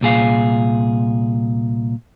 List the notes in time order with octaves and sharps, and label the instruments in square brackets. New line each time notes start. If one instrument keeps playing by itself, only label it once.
[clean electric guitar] C2 A#2 G#4 F5